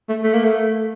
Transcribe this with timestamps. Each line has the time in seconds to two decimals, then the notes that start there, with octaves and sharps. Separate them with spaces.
0.09 A3
0.23 A3
0.34 A#3
0.44 A3